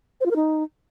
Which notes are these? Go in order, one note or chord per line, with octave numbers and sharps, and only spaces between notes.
C5
F4
A#4
D#4